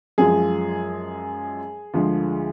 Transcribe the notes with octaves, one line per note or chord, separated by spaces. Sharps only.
F#2 F3 G#3 G#4
D2 D3 F3 G#3